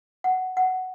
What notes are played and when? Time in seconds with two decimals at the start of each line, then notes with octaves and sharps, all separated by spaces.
0.24 F#5
0.57 F#5